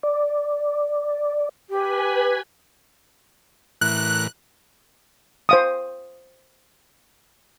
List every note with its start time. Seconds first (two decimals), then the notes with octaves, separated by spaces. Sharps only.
0.03 D5
1.70 G4 B4 G#5 B5
3.81 A2 E3 A#4 F#6
5.49 C5 F5 D#6